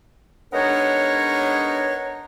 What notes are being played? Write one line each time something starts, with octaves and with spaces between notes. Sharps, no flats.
G#3 B3 D4 D#4 A#4 C#5